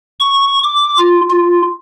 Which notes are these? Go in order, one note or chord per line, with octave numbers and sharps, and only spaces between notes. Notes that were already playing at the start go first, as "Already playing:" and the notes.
C#6
D6
F4
F4